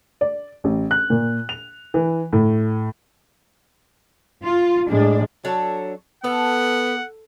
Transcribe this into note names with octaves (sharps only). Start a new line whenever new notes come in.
D5
A1
F#6
A#2
F7
E3
A2
F4
A2 G#3 D4
F#3 D4 A4 C#5
B3 A4 F#5